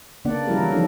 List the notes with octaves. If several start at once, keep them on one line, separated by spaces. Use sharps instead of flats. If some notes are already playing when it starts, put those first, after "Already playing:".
C#3 A#3 B3 D4 D5 F#5
F#3 G3 E4 F4 G4 A#4
E3
E3 F3 D4 D#4 A4